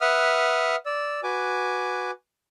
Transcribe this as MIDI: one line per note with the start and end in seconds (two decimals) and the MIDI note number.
0.01 0.76 71
0.01 0.76 76
0.01 0.76 78
0.01 0.76 87
0.01 0.76 89
0.86 1.20 74
0.86 1.20 88
1.23 2.11 66
1.23 2.11 71
1.23 2.11 80
1.23 2.11 86